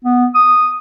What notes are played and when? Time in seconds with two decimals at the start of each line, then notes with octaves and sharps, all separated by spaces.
0.05 B3
0.35 D#6